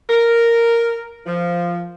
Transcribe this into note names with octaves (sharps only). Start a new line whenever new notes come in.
A#4
F3